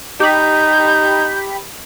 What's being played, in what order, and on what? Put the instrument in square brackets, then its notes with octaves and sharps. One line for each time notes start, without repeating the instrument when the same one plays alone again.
[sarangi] D#4 [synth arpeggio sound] G4 B5 [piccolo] G6